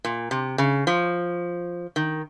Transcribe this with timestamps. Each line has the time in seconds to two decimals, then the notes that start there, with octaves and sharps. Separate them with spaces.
0.05 A#2
0.31 C3
0.58 C#3
0.87 F3
1.96 D#3